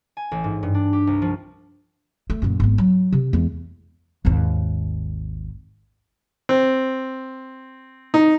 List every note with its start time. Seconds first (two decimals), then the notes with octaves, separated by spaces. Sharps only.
0.17 G#5
0.31 A1
0.44 G#2
0.63 G2
0.74 D4
0.93 G4
1.07 C2
1.22 F3
2.30 A3
2.42 F#2 A#2
2.60 G#1 B3
2.78 F#3
3.13 C3
3.33 E2 G#3
4.25 G#1 D#2
6.49 C4
8.14 D#4